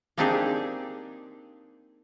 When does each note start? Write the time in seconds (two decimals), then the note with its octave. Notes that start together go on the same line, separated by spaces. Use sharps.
0.17 A#3 C4 D4 D#4 G4 G#4